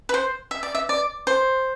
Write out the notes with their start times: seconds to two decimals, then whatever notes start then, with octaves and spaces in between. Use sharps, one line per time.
0.09 B4
0.14 C5
0.51 E5
0.63 D5
0.75 E5
0.89 D5
1.27 C5